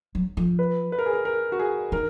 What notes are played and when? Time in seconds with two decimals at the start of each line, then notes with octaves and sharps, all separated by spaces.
0.15 F#3
0.37 F3
0.59 B4
0.92 B4
0.99 A#4
1.06 G#4
1.13 A#4
1.25 A#4
1.52 F#4
1.59 G#4
1.92 D#3 A#4